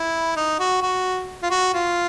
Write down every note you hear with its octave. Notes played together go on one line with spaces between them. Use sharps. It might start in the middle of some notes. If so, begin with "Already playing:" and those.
Already playing: E4
D#4
F#4
F#4
F4
F#4
F4